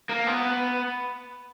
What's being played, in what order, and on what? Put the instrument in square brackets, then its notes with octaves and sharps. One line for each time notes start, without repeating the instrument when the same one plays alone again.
[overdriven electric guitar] A#3
B3